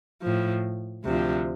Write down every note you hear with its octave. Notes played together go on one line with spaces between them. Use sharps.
A2 F3
D2 C3 F3